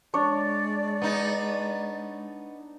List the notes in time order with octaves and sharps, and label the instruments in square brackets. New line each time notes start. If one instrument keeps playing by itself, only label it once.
[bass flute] G#3 [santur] D4 C#5 [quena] D5
[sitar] B3 D#4